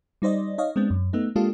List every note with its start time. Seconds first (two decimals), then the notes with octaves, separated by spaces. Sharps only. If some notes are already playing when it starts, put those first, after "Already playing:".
0.22 G3 D#4 C5 D5 D#5
0.58 D#4 C#5 D#5 F5
0.76 G#3 B3 C4 D4
0.90 F#2
1.13 A3 B3 D#4
1.36 G#3 A#3 D4 F4 G4 A4